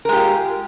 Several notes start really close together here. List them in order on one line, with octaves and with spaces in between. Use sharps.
A#4 G#3 G4 F4